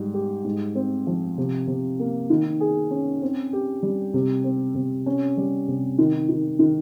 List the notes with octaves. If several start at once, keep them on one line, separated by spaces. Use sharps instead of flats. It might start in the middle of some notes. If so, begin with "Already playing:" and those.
Already playing: G#2 G3
G4
G#2
C4
F3
C3
C3
A#3
D#3
G#4
C#4
C4
G4
G3
C3
C4
C3
C#4
G3
C3
D#3
D#3
D#3